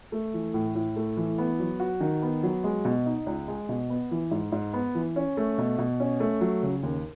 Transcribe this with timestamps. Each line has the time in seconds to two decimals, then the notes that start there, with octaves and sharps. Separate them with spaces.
0.12 A3
0.34 E3
0.54 A2
0.75 A2
0.96 A3
1.17 E3
1.38 B3
1.60 F#3
1.80 F#4
2.00 D#3
2.22 B3
2.43 F#3
2.64 G#3
2.85 B2
3.06 D#4
3.26 C#2
3.48 G#3
3.69 B2
3.90 B3
4.11 E3
4.31 G#2
4.52 G#2
4.73 B3
4.95 E3
5.16 C#4
5.37 A3
5.58 B2
5.78 B2
6.00 C#4
6.20 A3
6.41 F#3
6.63 C#3
6.83 D#2